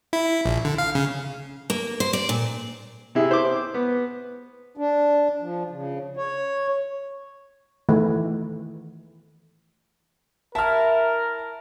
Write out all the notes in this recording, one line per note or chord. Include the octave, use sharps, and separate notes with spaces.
E4
A#1
D3
F5
C#3
A#3
C5
D5
A#2
C3 E4 G#4
C5 D6
B3
D4
F3
C#3
C#5
D#3 E3 A3
E4 A#4 A5 F6